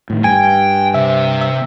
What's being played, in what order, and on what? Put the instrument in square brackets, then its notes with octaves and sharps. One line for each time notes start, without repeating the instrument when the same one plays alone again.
[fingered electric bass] A2 D#3
[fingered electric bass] G2 [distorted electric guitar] G5 [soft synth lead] G#5
[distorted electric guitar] C3 [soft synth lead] E5
[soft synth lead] E5